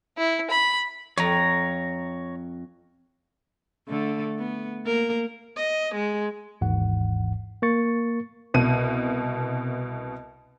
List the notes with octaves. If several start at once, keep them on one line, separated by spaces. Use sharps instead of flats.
E4
B5
F2 C#5 A#5
D3 A3
B3
A#3 A#4
D#5
G#3
G#1 D#2 G#2 E3 F#5
A#3 A#4 C#6 A6 C#7
C2 B2 D#7